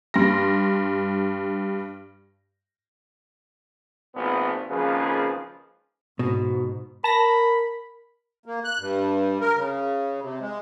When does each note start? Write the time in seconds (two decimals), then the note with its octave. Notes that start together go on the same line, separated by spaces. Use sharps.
0.14 G2 C6 A#6
4.16 G#1 A#2 B3
4.70 G#1 C#3 F3 A#3 G#4 B4
6.19 G#2 B2
7.04 A#4 A5 B5 A#6
8.46 A#3
8.64 F#6
8.79 G2
9.41 A#4
9.56 C#3
10.21 C3
10.40 G#3